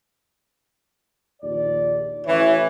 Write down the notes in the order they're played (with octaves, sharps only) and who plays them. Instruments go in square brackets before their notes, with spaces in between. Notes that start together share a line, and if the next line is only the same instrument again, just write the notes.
[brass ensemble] A#1 D#2 D5
[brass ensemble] A1 C#5 [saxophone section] E3